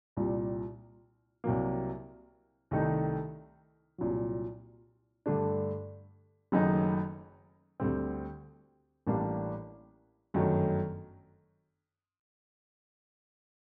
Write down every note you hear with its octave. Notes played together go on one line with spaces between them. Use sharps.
C2 A#2 G3
C2 C3 F#3 A#3
C2 C3 D#3 A3 D#4
C2 A#2 F#3
G2 D3 A3 D4
F#1 F#2 D#3 A3 D#4
D2 D3 G3 C4
A1 A2 G3 A#3 D4
G1 F#2 D#3 F#3 A3